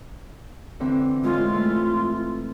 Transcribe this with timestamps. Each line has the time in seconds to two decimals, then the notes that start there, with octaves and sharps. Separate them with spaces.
0.80 D3 E3 C4
1.24 A2 G#3 F4
1.54 A3 E4